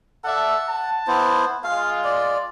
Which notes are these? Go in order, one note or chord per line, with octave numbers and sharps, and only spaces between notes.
A4 D5 E5 F#5
A5
B3 E4 C5
G#3 F4 F5
D5